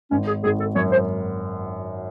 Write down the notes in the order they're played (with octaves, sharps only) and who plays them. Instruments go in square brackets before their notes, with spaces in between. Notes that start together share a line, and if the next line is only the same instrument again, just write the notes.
[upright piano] G#1 [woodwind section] C#4
[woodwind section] G#4
[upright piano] G#1 [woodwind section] G#4
[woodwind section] A4
[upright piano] F#2 [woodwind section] C#5
[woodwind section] C5